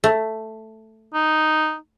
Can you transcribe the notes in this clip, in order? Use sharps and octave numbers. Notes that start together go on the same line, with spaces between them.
A3
D#4